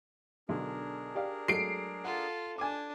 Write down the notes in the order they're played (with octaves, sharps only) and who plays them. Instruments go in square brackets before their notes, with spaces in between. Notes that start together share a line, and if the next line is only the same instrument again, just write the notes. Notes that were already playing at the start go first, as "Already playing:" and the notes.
[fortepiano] B1 D3 [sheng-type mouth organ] D4 G#4 A#4
[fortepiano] G4 D5 F5
[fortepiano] F#3 G#3 A3 [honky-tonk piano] C7 D7
[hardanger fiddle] F4 A4 [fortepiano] F#5
[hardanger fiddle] D4 [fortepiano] G#5 D6